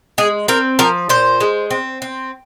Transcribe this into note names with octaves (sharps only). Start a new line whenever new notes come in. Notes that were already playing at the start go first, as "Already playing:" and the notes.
G#3 G#4
C4 A#4
F3 A#4
A#2 C5
G#3
C4
C4